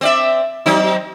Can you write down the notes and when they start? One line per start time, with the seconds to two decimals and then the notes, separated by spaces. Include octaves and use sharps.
0.01 C4 D5 E5
0.66 F#3 C4 D#4